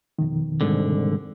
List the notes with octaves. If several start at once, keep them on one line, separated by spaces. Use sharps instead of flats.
F2 B2 D#3
C2 G#2 D3